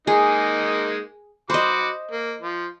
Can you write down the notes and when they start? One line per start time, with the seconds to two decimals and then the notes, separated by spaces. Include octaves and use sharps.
0.07 G#3 A#3 D#4 G#4
1.50 F#4 C5 D#5 B5 D6
2.11 A#3
2.41 F3